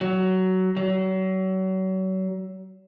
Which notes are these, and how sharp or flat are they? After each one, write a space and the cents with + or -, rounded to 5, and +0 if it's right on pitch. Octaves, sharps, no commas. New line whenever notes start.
F#3 +15
F#3 +35